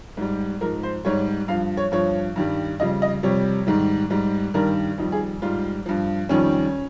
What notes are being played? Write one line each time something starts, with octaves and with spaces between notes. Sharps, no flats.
G#2 G3
G#2 F3 A#4
C5
G#2 G3 C#5
G2 F3 F5
C#5
G2 F3 C#5
G2 D#3 G3
F2 C#3 G3 D#5
D#5
F2 C3 G3 C#5
G#2 D#3 G3
G#2 G3
G2 D#3 G3 A#4
F2 D#3 G3 D#4
G#4
G#2 G3 F4
G2 F3
F2 D#3 G3 C#4